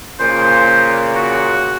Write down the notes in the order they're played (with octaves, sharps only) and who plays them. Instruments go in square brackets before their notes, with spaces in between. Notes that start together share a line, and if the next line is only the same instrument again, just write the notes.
[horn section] A#2 C#3 [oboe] C5
[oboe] F#4